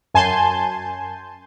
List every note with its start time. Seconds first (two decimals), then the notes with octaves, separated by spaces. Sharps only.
0.14 F#2 G#5 A5 C6 G6